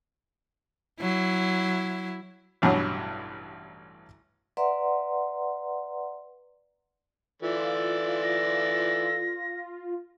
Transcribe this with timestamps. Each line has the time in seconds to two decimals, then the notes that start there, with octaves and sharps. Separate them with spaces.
1.01 F#3 E4
2.62 A1 G2 B2 F#3
4.57 B4 D5 E5 F#5 A#5 C6
7.42 E3 F4 A4 D5
8.23 A#6